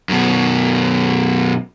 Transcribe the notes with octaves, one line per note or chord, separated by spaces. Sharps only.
F#2 B2